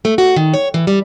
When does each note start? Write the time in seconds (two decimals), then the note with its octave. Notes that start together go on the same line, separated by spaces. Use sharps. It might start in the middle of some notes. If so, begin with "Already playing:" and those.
0.05 A3
0.18 F#4
0.36 D#3
0.54 C#5
0.74 E3
0.87 G3